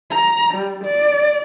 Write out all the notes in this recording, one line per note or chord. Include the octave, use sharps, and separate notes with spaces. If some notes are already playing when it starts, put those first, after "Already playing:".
A#5
G3
D5